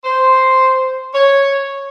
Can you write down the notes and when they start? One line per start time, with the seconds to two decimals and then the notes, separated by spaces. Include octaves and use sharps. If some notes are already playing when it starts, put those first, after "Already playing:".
0.04 C5
1.14 C#5